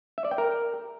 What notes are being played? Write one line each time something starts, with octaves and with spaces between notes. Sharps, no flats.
E5
D5
G5
A#4